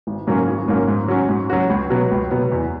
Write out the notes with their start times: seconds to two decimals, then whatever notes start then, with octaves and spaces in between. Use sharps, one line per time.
0.07 G#1
0.27 G#2 F#3 A#3 C#4
0.48 G#1
0.68 G#2 F#3 A#3 C#4
0.88 G#2
1.08 F#3 C#4 F#4
1.29 G#2
1.50 F#3 C#4 F#4
1.70 C#2
1.90 B2 F#3 B3
2.11 C#2
2.31 B2 F#3 B3
2.52 E2